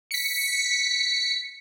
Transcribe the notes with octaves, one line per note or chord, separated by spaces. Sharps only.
B6 C#7